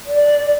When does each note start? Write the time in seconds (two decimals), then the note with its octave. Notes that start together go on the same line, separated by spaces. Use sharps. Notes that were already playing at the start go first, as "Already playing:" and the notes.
0.06 D5